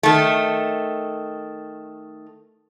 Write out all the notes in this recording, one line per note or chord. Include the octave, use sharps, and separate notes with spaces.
D#3 A3